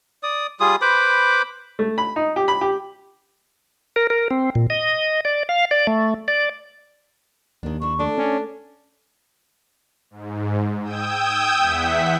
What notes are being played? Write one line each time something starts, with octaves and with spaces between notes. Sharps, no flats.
D5 D#6
G3 F4 G#4 D#6
B4 C5 B5 D6
A3
B5
D#4
G4
B5
G4
A#4
A#4
C4
A#2
D#5
D5
F5
D5
A3
D5
D#2 D#3 D4
D4 E4 C#6
A3 D4
C#4 D5
G#2
G5 D#6 E6 G6 G#6
E2 E5 F#5 B6